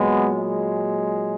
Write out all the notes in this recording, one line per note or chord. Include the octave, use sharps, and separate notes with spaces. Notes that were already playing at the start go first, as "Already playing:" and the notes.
Already playing: A#2 F#3 G#3 B3
G#3